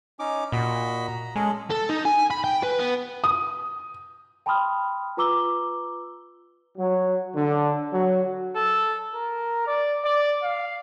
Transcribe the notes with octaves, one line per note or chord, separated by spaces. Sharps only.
C#4 D#4 D6
A#2 F#4 D#5 B5
A#5
G#3 C#4 G#4 A4
A4
D#4
G#5
B5
G5
B4
B3
D#6
G5 A5 B5 C6 D#6 F6
F4 B4 A#5 D6 E6 G7
F#3
D3
F#3
A4
A#4
D5
D5
F5